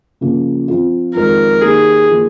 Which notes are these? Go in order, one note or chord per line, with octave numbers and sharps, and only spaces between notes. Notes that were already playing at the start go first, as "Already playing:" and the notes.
C#3 F3 A#3 F4
F3 C4 F4
F2 D#3 G#3 A#4
D#3 A#3 D#4 G4 G#4
F3 A#3 D#4